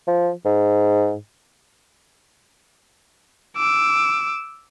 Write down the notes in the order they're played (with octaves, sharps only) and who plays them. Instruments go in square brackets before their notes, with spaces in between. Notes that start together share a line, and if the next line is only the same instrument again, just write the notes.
[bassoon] F3
G#2
[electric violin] D6 E6